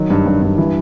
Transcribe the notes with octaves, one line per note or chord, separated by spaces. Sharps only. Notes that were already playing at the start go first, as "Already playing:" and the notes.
Already playing: D#3 F#3
G2
G2
G2
E3